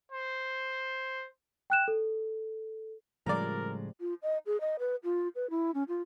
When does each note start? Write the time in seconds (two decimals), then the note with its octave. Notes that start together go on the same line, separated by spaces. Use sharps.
0.12 C5
1.70 G5 F#6 E7
1.88 A4
3.26 A2 C#3 F3 G3 G#3 A#4 D5 A#5
4.00 F4
4.22 D#5
4.46 G#4
4.61 D#5
4.79 B4
5.04 F4
5.35 B4
5.50 E4
5.74 C#4
5.88 F4